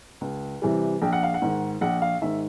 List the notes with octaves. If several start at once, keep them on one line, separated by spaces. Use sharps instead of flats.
C#2
C3 E3 G3
A#1 G5
F#5
F5
F#5
G#2 D#3
A#1 F#5
F5
G#2 D#3 E5